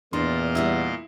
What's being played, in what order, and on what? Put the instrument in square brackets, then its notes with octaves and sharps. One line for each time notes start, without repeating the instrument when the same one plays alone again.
[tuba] E2 [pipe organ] A#2 D#5 F5 [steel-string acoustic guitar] D4 [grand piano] C6
[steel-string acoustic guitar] G3 F#4 A#4 [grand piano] E4